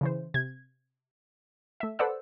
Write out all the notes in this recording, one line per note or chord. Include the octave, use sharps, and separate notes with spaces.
C#3 E3 C5
C3 G#6
A3 E5
A4 B4 C5 D5 F#5 E6